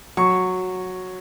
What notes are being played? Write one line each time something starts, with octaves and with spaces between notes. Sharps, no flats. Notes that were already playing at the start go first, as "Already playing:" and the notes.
F#3 C#6